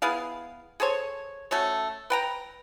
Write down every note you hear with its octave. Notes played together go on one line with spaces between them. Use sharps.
B3 E4 G#4 F5
G#4 A4 C5 C#5
A3 C#4 F#4 C#5
B4 G5 A#5